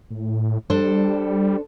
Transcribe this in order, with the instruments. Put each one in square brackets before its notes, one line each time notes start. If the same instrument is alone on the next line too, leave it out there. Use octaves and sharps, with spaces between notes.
[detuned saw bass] A2
[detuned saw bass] G3 [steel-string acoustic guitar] D4 A4 C5